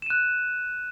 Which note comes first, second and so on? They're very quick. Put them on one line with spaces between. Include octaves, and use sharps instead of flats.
E7 D#7 F#6